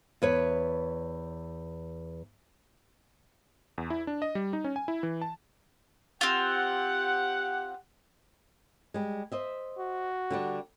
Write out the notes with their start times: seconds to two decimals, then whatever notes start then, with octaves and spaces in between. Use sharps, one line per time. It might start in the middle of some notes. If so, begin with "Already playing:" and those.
0.22 E2 B4 C#5
3.78 E2
3.90 E4
4.07 D4
4.22 D#5
4.35 G3
4.53 D#4
4.64 C#4
4.76 G#5
4.88 E4
5.03 E3
5.22 A5
6.21 C4 F4 G4 F#5
8.94 G3 G#3
9.32 C5 D#5 E5
9.79 F#4
10.31 D3 G3 D4